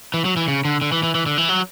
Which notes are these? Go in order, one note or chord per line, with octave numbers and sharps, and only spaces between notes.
E3
F#3
E3
C#3
D3
D3
E3
E3
E3
D3
E3
F#3